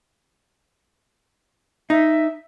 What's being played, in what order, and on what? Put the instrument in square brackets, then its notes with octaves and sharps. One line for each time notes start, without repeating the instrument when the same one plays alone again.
[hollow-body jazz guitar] D#4 [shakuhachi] E5